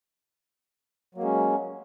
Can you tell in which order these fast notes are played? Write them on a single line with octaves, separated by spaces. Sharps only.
F#3 A#3 G#3 C#4